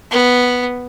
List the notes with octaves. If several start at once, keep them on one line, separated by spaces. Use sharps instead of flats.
B3